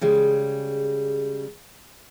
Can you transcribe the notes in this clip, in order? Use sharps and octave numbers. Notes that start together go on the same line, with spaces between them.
C#3 G3 G#3